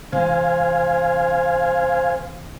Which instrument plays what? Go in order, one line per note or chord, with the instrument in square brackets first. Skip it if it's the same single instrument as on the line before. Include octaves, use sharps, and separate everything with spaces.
[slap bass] C3 E3 G#3 [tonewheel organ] C5 F5 G#5